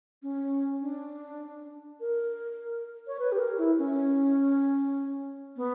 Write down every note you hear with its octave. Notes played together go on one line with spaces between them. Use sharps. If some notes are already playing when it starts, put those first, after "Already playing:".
C#4
D4
A#4
C#5
B4
G4
A#4
E4
C#4
B3